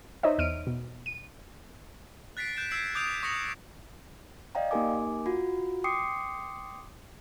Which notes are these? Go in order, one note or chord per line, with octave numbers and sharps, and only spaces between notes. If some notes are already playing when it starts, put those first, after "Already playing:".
D#4 C5 C#5 D#5 E5
E2 F6 D7 D#7
B2
D#7
F#6 A6 B6 C7 D7
F#6 G6 D7 E7
E6 G#6 C7 D7
D6 D#6 G6 C7 D7 F7
C#6 D#6 A#6 C#7 F7 F#7
D5 D#5 F5 G5 A#5
A#3 D#4 G4 A#4 G#5 D6
F4 F#4
G5 C6 D6 D#6 C7 C#7